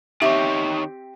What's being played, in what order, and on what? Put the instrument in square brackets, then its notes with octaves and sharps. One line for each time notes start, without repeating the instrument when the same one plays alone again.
[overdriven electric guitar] D#3 C#5 [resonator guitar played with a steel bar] C4 G4 E5